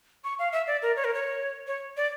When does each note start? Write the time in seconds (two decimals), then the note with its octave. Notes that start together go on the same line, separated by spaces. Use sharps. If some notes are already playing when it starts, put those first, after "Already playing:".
0.24 C#6
0.39 F5
0.52 E5
0.67 D5
0.82 A#4
0.96 C#5
1.04 A#4
1.14 C#5
1.67 C#5
1.97 D5